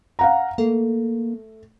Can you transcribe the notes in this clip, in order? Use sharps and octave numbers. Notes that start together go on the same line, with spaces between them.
F5 F#5 A#5
A3 A#3